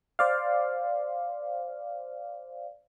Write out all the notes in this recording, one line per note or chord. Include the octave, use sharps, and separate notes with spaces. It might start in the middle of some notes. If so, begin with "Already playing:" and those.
C5 D5 F5